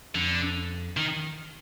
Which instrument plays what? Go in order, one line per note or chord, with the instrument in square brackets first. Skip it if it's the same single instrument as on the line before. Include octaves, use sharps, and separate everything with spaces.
[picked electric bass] F2 [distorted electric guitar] D3
[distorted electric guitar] D#3